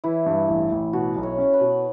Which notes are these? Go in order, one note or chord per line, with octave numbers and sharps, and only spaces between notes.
E3 E4
G2
A1
A1
B2 F#4
B1
C#5
C#4
B4
B2